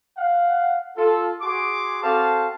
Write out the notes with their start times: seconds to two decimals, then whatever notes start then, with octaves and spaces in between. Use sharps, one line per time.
0.17 F5 F#5
0.97 F4 A4
1.41 F#4 G#4 C6 D6
2.03 C4 F#4 A4 C5 F5 A5